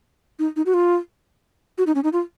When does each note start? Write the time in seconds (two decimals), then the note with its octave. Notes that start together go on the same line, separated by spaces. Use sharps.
0.39 D#4
0.56 D#4
0.66 F#4
0.74 F4
1.78 F#4
1.87 D#4
1.95 C#4
2.04 D#4
2.13 F4